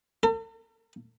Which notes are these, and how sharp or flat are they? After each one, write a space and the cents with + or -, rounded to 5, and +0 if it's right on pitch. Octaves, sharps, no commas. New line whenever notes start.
A4 +45